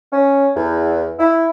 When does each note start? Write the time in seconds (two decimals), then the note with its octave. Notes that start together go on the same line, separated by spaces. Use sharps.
0.12 C#4
0.55 E2
1.19 E4